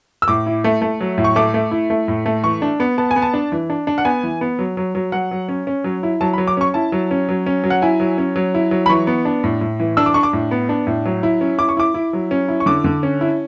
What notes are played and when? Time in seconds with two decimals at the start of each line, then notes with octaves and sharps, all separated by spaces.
0.22 E6
0.28 A2 D6
0.46 E4
0.64 A3
0.82 A3
1.00 F#3
1.18 A2
1.24 C#6
1.36 A3 D6
1.54 A3
1.71 E4
1.90 A3
2.08 A2
2.26 A3
2.44 E3 C#6
2.62 D4
2.80 B3
2.98 B3 A5
3.11 G#5
3.16 B3
3.22 A5
3.34 D4
3.52 E3
3.70 D4
3.87 D4
3.98 F#5
4.05 B3 G#5
4.23 E3
4.41 B3
4.59 F#3
4.77 F#3
4.95 F#3
5.12 F#3 F#5
5.31 F#3
5.49 C#4
5.67 C#4
5.84 F#3
6.03 E4
6.21 F#3 A5
6.33 B5
6.38 F#3
6.47 D6
6.57 C#4 C#6
6.74 E4 A5
6.92 F#3
7.11 C#4
7.29 F#3
7.46 C#4
7.64 F#3
7.70 F#5
7.82 E4 G#5
8.00 F#3
8.18 C#4
8.36 F#3
8.54 E4
8.71 F#3
8.86 B5
8.90 E3 C#6
9.07 B3
9.25 D4
9.44 A2
9.61 A2
9.80 E3
9.97 D4 E6
10.06 D6
10.14 D4 C#6
10.23 D6
10.33 A2
10.51 B3
10.69 D4
10.87 A2
11.05 F#3
11.23 E4
11.41 C#4
11.58 E4 D6
11.69 C#6
11.77 E4 D6
11.94 E4
12.13 F#3
12.31 C#4
12.48 E4
12.60 C#6
12.66 D3 D6
12.84 D3
13.03 C#4
13.21 E4